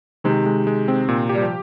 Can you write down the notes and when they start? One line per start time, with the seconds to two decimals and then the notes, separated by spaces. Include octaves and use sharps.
0.24 C3 D#3 G#3
0.46 G#3
0.67 G#3
0.88 C4
1.09 A#2
1.29 G4
1.34 G3
1.42 F3